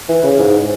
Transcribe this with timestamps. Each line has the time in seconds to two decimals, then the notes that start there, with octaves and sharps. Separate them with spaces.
0.09 E3
0.23 C#3
0.39 G#2